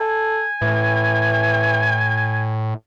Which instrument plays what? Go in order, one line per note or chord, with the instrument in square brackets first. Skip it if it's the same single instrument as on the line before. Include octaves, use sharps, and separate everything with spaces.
[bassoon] A4 [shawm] G#5
[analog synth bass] A2 [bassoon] E3